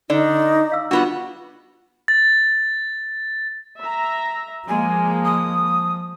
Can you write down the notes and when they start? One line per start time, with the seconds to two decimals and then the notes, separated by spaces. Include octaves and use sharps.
0.10 D3 D#4 D5
0.72 F5 E6
0.91 G3 B3 D4 F4 F#4
2.08 A6
3.81 E5 A#5
4.68 F3 G#3 A#3 G#5
5.24 D#6